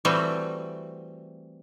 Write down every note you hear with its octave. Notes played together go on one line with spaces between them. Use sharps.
E3 G3 A3 C4 F#4